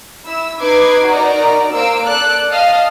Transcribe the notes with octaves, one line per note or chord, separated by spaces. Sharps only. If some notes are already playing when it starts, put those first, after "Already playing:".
E4 E6
D#4 B4 D6 G#6 C7
D#4 F#4 A#4 D5 A#5
A#3 A#4 C5 F5 E6 D7
A4 D5 F#6
D#5 F5 A5 D#6 F6